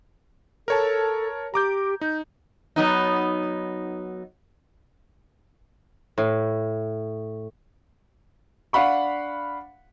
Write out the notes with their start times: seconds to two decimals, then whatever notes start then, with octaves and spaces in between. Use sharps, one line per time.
0.68 A4 A#4 C#5 A5
1.54 G4 A#5 D6 G6
2.01 D#4 G6
2.76 F#3 B3 D#4
6.18 A2
8.73 D4 F5 F#5 B5 C#6